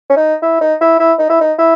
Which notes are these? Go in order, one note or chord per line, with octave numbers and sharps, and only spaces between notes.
C#4
D#4
E4
D#4
E4
E4
D#4
E4
D#4
E4